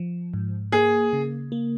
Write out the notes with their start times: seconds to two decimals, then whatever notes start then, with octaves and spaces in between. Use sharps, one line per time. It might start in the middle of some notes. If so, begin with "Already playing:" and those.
Already playing: F3
0.34 G#2
0.72 A#3 G#4
1.13 C#3
1.52 A#3